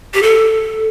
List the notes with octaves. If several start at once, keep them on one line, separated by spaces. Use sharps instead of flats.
G4
A4